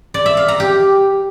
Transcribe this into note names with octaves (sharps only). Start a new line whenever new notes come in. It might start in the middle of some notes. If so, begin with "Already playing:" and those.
D5
E5
F5
A#5
G4